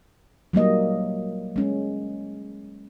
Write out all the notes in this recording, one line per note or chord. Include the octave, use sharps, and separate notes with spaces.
F#3 G3 A#3 D#5
G#3 C#4